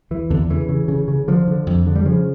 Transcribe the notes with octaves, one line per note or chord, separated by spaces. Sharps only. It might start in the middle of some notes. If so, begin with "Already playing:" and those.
E2 E3
E2 D3
C#3 E3
C#3
C#3
C#3
D3 F3
D3
F2
D3
G3
C#3 F3